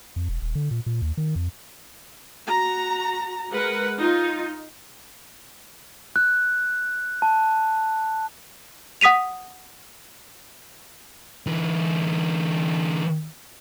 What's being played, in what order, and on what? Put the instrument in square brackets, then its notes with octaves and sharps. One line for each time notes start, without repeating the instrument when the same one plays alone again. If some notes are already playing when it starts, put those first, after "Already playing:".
[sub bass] F2
E1
D#1
D3
A#2
A#2
D#2
D#3
F2
[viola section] F#4 A#5
G#3 A#4 B4 F#5
D#4 F4
[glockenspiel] F#6
A5
[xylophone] F#5 D#6 B6 D#7 F7
[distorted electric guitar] D3 E3